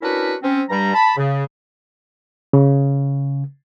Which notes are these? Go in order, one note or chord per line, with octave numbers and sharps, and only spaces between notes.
C#4 D4 E4 F#4 A#4 B4
C4 C#4
G2 G3 A#5
A5 B5
C#3
C#3